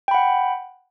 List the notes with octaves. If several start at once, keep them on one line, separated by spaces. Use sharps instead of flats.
F#5 G5 B5